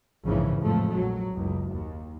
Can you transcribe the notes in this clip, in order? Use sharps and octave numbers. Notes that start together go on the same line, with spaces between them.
A#1 E2 G#2 C#3 E3
A1 F2 F3 G#3 A3
A#1 F#3
F#1 C#2
D#2